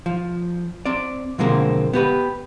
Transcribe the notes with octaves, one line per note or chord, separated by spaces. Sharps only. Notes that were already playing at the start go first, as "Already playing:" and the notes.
F3
C4 D5
B2 D3 F3 G#3 A#3 C4
B3 G4 B4